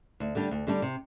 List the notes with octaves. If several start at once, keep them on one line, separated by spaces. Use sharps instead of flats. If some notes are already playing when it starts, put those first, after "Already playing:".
D2
D3 G3 D4
D2
D3 G3 D4
C3